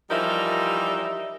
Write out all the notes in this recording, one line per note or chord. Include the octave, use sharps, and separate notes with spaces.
E3 F3 G3 D#4 A#4 E5